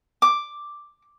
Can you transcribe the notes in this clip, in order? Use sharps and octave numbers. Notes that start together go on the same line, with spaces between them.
D6